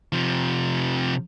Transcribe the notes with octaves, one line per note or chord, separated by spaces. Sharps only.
C3 F3